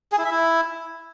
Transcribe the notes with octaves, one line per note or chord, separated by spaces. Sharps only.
G#4
E4
E5
E4